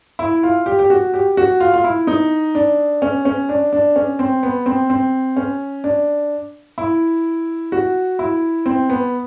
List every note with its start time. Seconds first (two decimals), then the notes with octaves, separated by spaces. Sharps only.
0.19 E4
0.43 F4
0.66 G4
0.79 G4
0.90 F#4
1.14 G4
1.37 F#4
1.60 F4
1.74 F4
1.84 E4
2.07 D#4
2.55 D4
3.02 C#4
3.25 C#4
3.49 D4
3.73 D4
3.96 C#4
4.19 C4
4.43 B3
4.66 C4
4.90 C4
5.36 C#4
5.84 D4
6.78 E4
7.72 F#4
8.19 E4
8.66 C4
8.90 B3